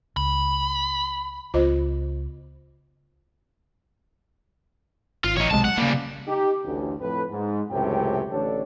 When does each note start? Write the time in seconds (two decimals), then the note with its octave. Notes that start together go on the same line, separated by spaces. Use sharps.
0.17 C#2 B5
1.54 C#2 B3 F4 C5 D#5
5.24 G#1 F4
5.37 A1 D#4 C#5
5.51 B1 C3 G#3 A5
5.65 F#5
5.78 C#3 G3 A#3
6.27 D#4 G4
6.64 A1 D2
7.00 F2 A2 B4
7.30 G#2
7.70 C#2 F#2 A2 C3 G5
8.30 A1 D3 D4 A4 C#5